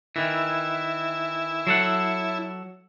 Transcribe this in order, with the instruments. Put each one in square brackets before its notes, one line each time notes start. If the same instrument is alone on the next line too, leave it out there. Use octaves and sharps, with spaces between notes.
[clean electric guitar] D#3 E3 [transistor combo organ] E4
[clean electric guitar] F#3 A4 F#5